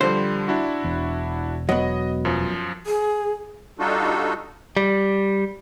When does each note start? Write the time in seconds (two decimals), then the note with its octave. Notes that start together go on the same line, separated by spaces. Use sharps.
0.01 D3 F3 G3 C5
0.48 D4 E4 F#4
0.84 E1
1.69 F#3 B3 D#5
2.25 F#2 F3
2.86 G#4
3.79 G3 D4 D#4 F4 F#4 A4
4.77 G3